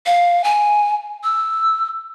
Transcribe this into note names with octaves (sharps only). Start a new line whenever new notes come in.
F5
G#5
E6